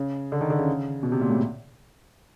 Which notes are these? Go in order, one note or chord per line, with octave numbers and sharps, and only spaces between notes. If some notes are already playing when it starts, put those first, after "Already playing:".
Already playing: C#3
D3
D#3
D3
C#3
B2
C3
A#2
A2